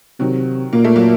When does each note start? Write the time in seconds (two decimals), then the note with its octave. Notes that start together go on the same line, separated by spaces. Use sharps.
0.20 C3 D#3 F#3
0.73 A#2 A#3
0.84 A3
0.96 F#3 A#3